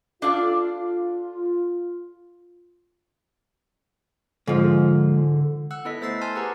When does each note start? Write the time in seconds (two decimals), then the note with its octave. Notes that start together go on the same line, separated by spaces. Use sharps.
0.22 D4 F4 A4 F5
4.47 G#2 D3 F3
5.71 F#5 E6 F#6
5.85 B3 E4 A4 D#5 B6
6.01 A3 C5 E6 A6 C7
6.21 G#5 A5 C6 E6 F6 A6
6.35 G4 G#4 B4 F#5 A#5